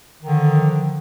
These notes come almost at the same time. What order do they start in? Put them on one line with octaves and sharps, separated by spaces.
D#3 D3 F3